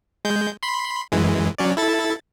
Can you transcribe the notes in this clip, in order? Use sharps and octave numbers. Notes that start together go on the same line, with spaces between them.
G#3 G6
B5 C6
F#2 E3 G#3
F#3 C#4 D5
E4 A4 A6